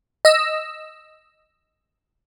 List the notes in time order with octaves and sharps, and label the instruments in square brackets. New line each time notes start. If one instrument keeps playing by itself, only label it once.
[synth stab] D#5 E6